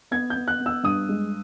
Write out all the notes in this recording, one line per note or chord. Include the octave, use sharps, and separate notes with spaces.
B3 G#6
G6
B3
F#6
B3
E6
G2 D#6
G#3